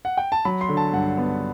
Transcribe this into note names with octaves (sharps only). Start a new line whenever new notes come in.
F#5
G5
A5
F#3 B5
C6
D3
A5
G2 F#5
B3